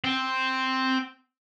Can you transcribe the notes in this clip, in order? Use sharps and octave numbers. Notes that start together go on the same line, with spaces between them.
C4